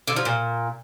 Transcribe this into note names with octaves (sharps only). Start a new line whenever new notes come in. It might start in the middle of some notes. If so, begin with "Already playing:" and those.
D3
F3
A#2